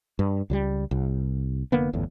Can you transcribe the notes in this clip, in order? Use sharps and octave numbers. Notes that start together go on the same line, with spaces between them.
G2
C#2 F#3 G3
C2
F1 D3 A#3 B3
G1 E2 A2